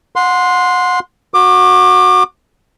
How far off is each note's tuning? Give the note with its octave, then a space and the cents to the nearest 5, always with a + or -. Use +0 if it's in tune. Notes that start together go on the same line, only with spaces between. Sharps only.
F#5 -30 C6 +0
F#4 -15 D6 +25